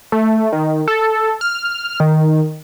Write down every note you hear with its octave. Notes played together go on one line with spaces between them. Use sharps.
A3
D#3
A4
F6
D#3